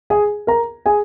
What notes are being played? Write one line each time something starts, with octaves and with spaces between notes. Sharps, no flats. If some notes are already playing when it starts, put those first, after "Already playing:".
G#4 G#5
A#4 A#5
G#4 G#5